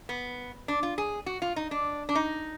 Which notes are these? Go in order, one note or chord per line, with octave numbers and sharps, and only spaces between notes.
B3
D4
F4
G#4
F#4
F4
D#4
D4
D4
D#4